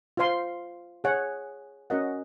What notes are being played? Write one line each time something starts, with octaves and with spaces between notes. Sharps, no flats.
F4 C5 F5 C6
G#4 C#5 F#5
C#4 F#4 A#4 D#5 F#5